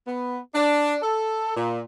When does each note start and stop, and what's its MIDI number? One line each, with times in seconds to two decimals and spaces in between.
0.07 0.37 59
0.54 0.94 62
1.02 1.54 69
1.55 1.80 46